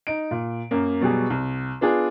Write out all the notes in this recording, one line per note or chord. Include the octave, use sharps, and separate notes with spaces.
D#4 D7
A#2
F#2 A#3
B2 F#3 G3 G#4
C2
B3 D4 F4 G#4